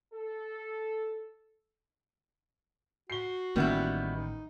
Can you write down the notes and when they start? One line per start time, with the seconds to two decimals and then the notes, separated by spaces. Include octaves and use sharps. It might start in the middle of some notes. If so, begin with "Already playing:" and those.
0.13 A4
3.10 F#4 C7 G7
3.56 A1 D#3 G3 A#3 B3 C#4 E4
4.10 D#4